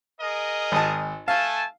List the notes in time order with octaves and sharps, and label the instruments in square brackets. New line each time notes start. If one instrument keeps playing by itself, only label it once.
[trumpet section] G#4 A#4 D#5
[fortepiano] G#1 A5
[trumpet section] A3 G#5 A5 [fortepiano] F5